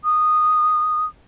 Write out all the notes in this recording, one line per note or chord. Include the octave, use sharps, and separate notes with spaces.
D#6